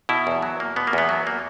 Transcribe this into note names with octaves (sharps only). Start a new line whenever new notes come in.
B2 E4
E2
F#3
A#3
B2 B3
A#3
E2 B3
F#3
A#3